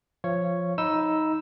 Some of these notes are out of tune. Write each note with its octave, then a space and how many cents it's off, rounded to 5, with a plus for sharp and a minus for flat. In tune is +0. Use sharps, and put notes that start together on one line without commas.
F3 +0 C#5 +0 F5 -30
D#4 +10 B5 +0 E6 +0